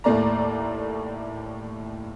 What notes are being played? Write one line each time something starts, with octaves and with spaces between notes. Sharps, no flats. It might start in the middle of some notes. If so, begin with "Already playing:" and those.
D#2 A2 A3 A#3 D5 A#5